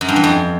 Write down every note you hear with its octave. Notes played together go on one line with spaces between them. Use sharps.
F#2
G2
E3
F2